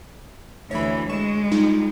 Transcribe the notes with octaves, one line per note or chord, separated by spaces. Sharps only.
D2 E3 C#5 B5
G#3 C#6 E7
G3 D#4 F4